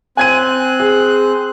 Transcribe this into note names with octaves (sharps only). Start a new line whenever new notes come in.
C4 G#5 F#6 G#6 D#7
G#4